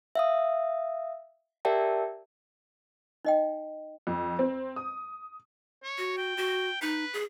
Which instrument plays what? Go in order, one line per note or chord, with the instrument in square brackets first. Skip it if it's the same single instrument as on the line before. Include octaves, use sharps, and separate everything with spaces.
[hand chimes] E5 F5 D#6
G4 A#4 D5 E5 G5 A5
[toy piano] D#4 D#5 G5
[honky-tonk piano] F2
C4
D#6
[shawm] C#5
[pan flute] F#4
[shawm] G5
[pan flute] F#4
[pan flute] D#4 [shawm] B4
[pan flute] G#4